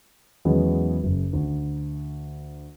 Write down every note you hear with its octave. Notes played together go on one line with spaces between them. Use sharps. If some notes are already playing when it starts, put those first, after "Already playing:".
E2 F#3 G#3 B3 C#4
F#1
D2